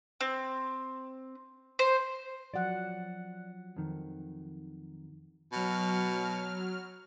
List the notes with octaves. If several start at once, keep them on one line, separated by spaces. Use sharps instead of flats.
C4
C5
F3 F#3 D5 F#5
F2 D#3
B2 F#3 F6